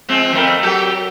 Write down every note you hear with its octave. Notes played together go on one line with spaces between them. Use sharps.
F3 G#3 C4
F2 A3 A#4
F#3 G4 A4